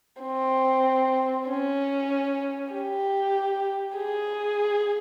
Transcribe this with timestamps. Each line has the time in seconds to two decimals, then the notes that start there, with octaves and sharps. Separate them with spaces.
0.22 C4
1.48 C#4
2.72 G4
3.97 G#4